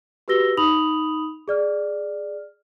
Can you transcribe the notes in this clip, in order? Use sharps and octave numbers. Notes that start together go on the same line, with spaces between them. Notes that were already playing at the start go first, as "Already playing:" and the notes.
F#4 G4 B4 E6 A#6 G7
D#4 B5 D#6 F7 F#7
G#4 D5 F6